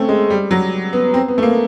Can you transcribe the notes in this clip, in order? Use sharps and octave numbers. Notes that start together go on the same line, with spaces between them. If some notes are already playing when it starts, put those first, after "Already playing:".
Already playing: A3 C4 C#4
G#3
G3
F#3
B3
C4
B3
A3
A#3